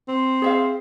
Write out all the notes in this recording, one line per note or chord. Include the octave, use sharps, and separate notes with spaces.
C4
G#4 E5 F5